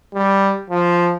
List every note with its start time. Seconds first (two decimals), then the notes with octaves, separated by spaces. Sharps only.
0.14 G3
0.70 F3